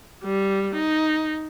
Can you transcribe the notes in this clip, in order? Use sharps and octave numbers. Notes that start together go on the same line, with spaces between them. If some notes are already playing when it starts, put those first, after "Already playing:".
G3
D#4